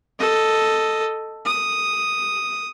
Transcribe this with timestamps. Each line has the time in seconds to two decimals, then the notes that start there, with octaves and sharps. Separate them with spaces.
0.19 A4 D#5
1.46 D#6